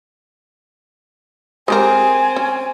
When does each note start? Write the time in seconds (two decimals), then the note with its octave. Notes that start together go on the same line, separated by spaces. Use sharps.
1.68 G#3 C4 G4 A#4 G#5
2.36 C#4